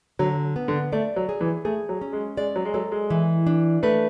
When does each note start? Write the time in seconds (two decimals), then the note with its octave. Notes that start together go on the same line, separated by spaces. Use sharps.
0.19 D3 F#3
0.56 B3
0.68 D3
0.93 A3 D5
1.16 F#3
1.29 G#4
1.41 E3
1.65 A3 G#4
1.89 F#3
2.01 C#4
2.13 G#3
2.37 G#3 D5
2.56 F#3
2.65 G#3
2.74 F#3 A4
2.92 G#3
3.10 E3
3.47 D4
3.83 A3 B4